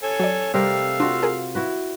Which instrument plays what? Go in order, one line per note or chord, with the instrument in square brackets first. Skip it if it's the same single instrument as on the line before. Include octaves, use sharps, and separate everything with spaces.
[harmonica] A4 C#5 G#5
[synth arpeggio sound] F#3 D5
[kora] C3 G3 A#4 [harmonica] A3 F5 E6
[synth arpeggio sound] D4 [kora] F4 F#4
[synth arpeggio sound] G#4 A#4
[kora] E4 F#4 B4